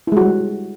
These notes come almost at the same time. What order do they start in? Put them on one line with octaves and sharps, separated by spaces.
E4 G#3 F#4 G3